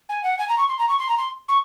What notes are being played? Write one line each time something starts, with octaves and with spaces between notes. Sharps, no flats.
G#5
F#5
G#5
A#5
C#6
C6
A#5
C#6
C6
A#5
C6
C#6